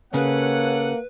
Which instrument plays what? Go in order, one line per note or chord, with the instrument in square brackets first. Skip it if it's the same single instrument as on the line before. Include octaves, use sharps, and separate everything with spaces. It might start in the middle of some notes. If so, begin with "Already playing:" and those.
[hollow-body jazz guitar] C#3 [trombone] A#3 [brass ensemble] A4 C#5 F#5 [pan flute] B4